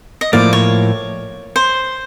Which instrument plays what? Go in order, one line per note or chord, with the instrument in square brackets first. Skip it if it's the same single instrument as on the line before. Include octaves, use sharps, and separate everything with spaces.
[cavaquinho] D#5
[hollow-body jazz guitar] A2 F3 A#3 [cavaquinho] D5
[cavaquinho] C#5
C5